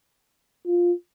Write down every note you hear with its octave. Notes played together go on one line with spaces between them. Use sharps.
F4